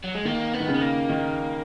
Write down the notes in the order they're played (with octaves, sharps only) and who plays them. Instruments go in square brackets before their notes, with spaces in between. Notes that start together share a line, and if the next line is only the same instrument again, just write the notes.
[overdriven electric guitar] F#3
G#3
[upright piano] D#3 [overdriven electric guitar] A#3
[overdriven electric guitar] B3
[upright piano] D#3
C#3
[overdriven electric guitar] B3
A#3
[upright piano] D#3